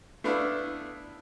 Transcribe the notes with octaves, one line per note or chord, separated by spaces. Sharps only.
A3 B3 D4 E4 F5